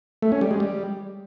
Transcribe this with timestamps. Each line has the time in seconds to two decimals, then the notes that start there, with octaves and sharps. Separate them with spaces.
0.22 A3
0.32 C#4
0.41 G3
0.51 G#3
0.60 G3